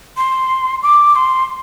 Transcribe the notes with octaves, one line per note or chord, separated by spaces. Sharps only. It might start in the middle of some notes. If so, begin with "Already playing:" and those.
C6
D6
C6